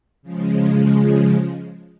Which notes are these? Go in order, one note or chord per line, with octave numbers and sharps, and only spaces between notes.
C#3 F3 G#3